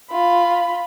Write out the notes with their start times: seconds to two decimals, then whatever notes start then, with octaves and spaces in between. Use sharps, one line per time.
0.11 F4 B5